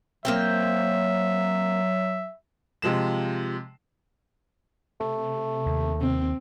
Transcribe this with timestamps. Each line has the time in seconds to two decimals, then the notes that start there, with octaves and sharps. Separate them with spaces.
0.25 F#3 A#3 C4 E5 G5
2.82 C3 F3 G#3 E7
5.01 C3 A3
5.66 D#2
6.01 C3 C4